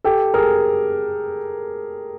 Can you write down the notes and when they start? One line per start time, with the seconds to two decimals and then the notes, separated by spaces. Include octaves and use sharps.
0.04 G4 A4
0.34 G#4 A#4